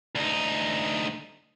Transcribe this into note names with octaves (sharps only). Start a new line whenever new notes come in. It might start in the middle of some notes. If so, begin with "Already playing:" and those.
D2 D#4